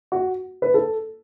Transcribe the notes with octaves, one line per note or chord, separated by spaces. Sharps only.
F#4
B4
A4